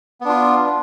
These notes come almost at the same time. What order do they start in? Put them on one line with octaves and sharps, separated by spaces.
B3 D4 F4